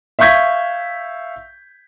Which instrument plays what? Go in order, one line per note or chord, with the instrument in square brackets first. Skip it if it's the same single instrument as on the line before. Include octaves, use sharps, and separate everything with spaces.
[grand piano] E5 F5 C#6 G6 G#6 B6